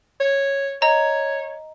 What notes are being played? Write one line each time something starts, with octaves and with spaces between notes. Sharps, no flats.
C#5
C#5 D#5 A#5